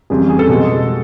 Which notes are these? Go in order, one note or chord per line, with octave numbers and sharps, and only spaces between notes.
F2 C#3 E3 G3 G#4
G#4
A4
B2 G#3